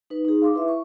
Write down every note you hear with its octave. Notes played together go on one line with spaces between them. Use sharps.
D#4 B4
D#4 G#4
F5 C6 D6
E4 B4 E5
C#6